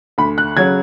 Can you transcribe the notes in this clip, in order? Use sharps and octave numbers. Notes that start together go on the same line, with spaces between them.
D2 B5
F#6
C#3 F#3 G#6